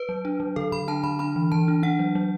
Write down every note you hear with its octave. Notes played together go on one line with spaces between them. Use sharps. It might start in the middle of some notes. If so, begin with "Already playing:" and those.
Already playing: B4
F#3
D4
F#3
D3 A4
D3 B5
D4 A5
D3 B5
D4 B5
E3
E3 A5
D4
D4 F#5
F#3
F#3